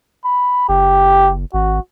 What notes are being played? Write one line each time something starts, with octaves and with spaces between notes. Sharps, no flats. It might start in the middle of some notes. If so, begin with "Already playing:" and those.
B5
F#1 G4
G#1 F#4